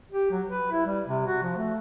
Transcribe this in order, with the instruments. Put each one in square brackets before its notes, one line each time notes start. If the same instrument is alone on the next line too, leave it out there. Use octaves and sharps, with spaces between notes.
[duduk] G4
F#3
B4
E4
G3
C3
F#4
F3
A3